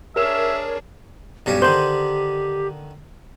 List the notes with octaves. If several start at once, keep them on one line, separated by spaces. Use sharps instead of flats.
D4 G#4 A#4 C#5 E5 E7
B1 G2 C#4 G4
D3 D#3 C5